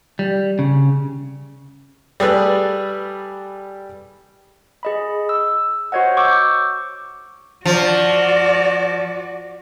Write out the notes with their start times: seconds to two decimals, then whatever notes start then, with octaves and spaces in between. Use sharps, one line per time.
0.19 G3
0.59 C#3
2.20 G3 G#4 A4 B4
4.83 G#4 D#5 B5
5.29 E6
5.92 F#4 C5 C#5 D#5 F#5
6.17 C#6 D6 E6 G6
7.65 F3 F#4 D5